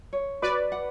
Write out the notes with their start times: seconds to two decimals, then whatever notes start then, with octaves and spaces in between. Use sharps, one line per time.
0.13 C#5
0.42 F#4 B4 D5
0.72 F#5